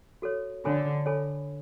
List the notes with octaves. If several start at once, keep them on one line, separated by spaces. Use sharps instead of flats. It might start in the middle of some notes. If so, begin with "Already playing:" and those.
F#4 A4 C#5
D3 A4 C#5 G#5 B5
A4 C#5 G#5 B5